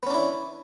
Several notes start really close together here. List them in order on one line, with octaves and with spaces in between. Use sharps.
B3 C#4 D4 E4